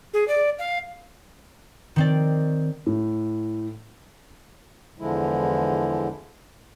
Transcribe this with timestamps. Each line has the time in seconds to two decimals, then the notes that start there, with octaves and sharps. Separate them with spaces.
0.14 G#4
0.28 D5
0.59 F5
1.96 D#3 C4 D5
2.86 A2
4.99 E2 D3 F3 G#3 E4